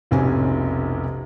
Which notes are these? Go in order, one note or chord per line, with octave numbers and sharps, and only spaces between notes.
F1 B1 C3 C#4 C5 G#5